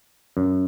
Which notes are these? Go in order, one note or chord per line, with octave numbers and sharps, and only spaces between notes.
F#2